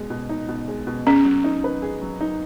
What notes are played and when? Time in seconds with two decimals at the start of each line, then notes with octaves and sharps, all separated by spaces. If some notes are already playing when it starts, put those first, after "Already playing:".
Already playing: B2 G#3
0.10 B2
0.29 D#4
0.49 B2
0.68 G#3
0.87 B2
1.06 C#4 G#4
1.25 F#3
1.44 D#4
1.64 B4
1.82 G#4
2.02 F#3
2.20 D#4